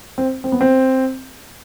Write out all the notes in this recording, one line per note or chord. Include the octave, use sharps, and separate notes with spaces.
C4
C4
B3
C4